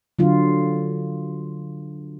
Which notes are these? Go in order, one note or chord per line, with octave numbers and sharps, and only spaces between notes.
D3 F#3 F4